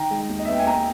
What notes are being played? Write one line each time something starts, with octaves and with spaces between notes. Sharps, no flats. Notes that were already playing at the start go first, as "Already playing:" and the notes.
Already playing: D#3 G5 A#5
G#3
D#2
D#5
E5
B3 G5
G#5
A#3 G5 A#5